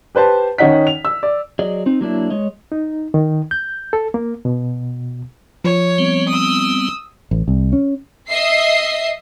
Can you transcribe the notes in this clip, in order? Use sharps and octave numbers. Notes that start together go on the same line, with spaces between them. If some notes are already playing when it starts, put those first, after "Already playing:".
G4 B4 C5 A5
D#3 C#4 D#4 F#5 B6
F7
E6
D5
F#3 G#4 D5 D#5
C4 D#4
F#3 A#3 D4 E4
G#3 C#5 D#5
D#4
D#3
G6
A4
A#3
B2
F3 C#5
G3 B3 C4
D#6 E6
A1
C2
C#4
D#5 E5 C7